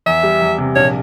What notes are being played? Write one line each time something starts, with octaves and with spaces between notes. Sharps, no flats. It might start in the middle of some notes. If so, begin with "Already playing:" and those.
E2 E5
G3
E2
C3
A#1 C#5